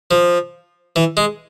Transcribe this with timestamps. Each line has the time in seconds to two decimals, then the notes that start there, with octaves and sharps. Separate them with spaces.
0.11 F3
0.96 E3
1.17 G#3